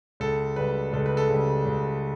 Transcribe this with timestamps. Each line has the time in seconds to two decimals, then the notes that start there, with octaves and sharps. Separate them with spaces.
0.20 C#2 A4
0.56 C#3 G3 B4
0.93 C#2 A4
1.06 B4
1.17 A4
1.29 C#3 G3
1.66 C#2